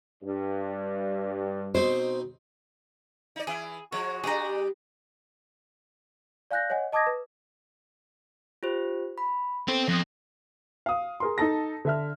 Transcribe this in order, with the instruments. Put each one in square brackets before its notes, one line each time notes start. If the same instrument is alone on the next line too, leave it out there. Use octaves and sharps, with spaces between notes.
[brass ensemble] G2
[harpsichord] B2 C4 D#4 [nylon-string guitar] C5
[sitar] D#4 D5
[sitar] E3 E4 [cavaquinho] G#4
[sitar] F3 G#3 [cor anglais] F#4 [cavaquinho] C#5
[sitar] G3 B3 D4 [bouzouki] G4 [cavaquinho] G#4 A#5
[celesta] D5 F5 G#5 F#6 G6 A#6
C#5 D#5 F#5 G#5
D#5 A5 D6 D#6 G#6 A#6
B4
[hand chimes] F4 G4 C5
B5
[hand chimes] B3 A4 [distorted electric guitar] C4
[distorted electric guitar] F2 [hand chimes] D#6 F#6 A#6
[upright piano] F5 D#6
G#4 A#4 C6
D#4 A4 A5 A#6
D3 E5 F6